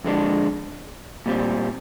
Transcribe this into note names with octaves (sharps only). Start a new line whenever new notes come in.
F2 D3 G#3 D4
A#2 G3 C4